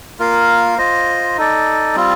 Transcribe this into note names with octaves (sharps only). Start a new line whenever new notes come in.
A#3 F4 A#4 F5
F4 C5 D#5
D#4 A4 D5
G3 C4 F4